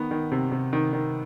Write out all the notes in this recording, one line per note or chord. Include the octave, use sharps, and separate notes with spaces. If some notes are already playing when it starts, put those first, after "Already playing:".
Already playing: D#3 B3
D#3
C3
C3
D#3
D#3